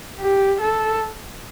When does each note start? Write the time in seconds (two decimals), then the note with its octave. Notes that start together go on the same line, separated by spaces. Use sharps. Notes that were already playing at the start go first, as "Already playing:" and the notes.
0.20 G4
0.60 A4